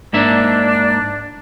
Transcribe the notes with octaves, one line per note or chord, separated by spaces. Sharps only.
G#2 A#3 D4 E5